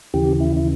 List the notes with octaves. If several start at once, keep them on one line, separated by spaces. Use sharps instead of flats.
D#2 C#3 E3 G4
E4
E4